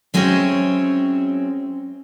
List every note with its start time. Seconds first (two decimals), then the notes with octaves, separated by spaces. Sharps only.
0.14 F#3 G#3 C4 C#4 E4 C#5